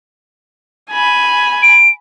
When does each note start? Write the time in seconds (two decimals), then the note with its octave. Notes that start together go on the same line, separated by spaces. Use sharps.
0.90 G#5 B5
1.63 D7